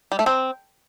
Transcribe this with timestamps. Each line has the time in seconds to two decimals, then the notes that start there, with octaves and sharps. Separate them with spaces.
0.12 G3
0.19 A3
0.26 C4